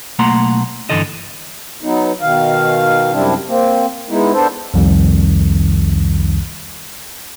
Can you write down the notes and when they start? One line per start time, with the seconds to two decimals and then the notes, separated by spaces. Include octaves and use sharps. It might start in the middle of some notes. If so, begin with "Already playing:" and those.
0.19 B1 A3 A#3 F#5 A#5 C6
0.90 G2 D3 E3 A4 D#5
1.83 F#3 B3 D#4
2.21 B2 D#3 F5
3.13 F#2 C3 G3 C4 D4 E4
3.48 A#3 C4
4.10 G#3 B3 D#4 E4
4.33 B3 D4 A4 C5
4.74 C2 F2 D#3 G3